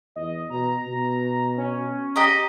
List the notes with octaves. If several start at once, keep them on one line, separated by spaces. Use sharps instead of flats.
E2 D#5
B2 A#5
B2
C#4
G4 D#5 A#5